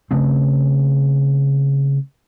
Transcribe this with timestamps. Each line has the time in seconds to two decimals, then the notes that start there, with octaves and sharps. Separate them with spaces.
0.11 C#3 A3 C4